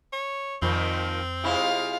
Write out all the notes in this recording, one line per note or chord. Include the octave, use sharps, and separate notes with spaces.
C#5
F2 A#2 D#3 F3 C4
C3 G#3 E4 F4 F5